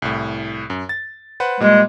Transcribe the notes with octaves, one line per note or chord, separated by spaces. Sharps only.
C2 A2
F#2
A6
B4 C5 F#5
A#2 G3 G#3 A#3